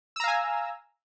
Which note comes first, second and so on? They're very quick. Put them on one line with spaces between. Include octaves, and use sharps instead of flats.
E6 A#5 F5 G#5